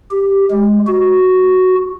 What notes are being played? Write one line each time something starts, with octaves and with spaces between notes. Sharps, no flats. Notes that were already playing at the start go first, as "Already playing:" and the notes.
G4
G#3
F#4